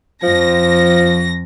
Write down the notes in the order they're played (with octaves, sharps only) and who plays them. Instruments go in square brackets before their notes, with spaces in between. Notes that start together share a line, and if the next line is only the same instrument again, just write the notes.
[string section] F2 A#6 [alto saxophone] F3